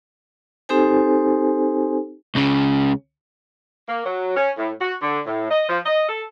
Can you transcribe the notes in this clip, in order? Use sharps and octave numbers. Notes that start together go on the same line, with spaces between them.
C4 D#4 G4 A4 C5 G#5
C#2 C#3
A#3
F#3
C#4
A2
F#4
D3
A2
D#5
F3
D#5
A4